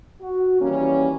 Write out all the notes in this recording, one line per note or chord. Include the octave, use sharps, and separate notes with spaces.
F#4
D#3 E3 G3 A#3 C#4